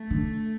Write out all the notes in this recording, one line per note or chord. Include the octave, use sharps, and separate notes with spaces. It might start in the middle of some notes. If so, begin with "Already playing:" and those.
Already playing: A3
D3